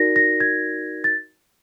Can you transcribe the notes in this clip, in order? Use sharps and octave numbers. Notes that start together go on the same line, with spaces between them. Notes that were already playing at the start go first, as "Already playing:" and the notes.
Already playing: D#4 F#4 A#4 D5 A#6
A#6
G#6
A6